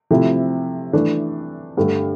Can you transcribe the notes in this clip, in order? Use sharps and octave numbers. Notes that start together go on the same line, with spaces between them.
C3 F3 A3 E4
E3 A3 D4
G2 D3 A3